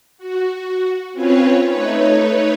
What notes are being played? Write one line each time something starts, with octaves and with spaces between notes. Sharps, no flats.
F#4
C4 C#4 F4 B4 C#5
A3 D#4 B4 C#5